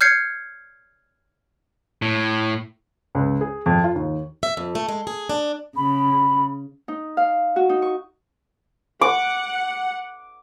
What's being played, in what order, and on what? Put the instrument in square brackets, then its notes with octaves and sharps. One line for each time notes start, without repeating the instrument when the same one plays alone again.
[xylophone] F6 G6 G#6 C7 C#7
[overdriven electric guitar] A2
[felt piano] C#2
G#4
F2
F4
D#2
[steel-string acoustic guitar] E5
F2
A3
G#3
G#4
D4
[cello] C#3 [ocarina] B5
[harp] D#4
F5
F#4
D#4
C#6
[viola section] F#5 [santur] D6